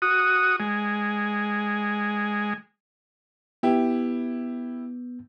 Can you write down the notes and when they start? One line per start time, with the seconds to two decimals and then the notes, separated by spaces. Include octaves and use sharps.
0.02 F#4 D#6
0.60 G#3
3.63 B3 E4 G4